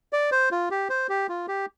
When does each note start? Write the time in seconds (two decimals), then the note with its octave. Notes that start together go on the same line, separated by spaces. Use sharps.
0.13 D5
0.32 C5
0.51 F4
0.71 G4
0.90 C5
1.09 G4
1.29 F4
1.48 G4